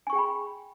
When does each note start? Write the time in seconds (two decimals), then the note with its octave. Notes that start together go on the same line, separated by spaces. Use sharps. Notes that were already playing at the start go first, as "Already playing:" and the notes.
0.07 G#5
0.10 C#6
0.13 G#4
0.16 G5
0.19 B5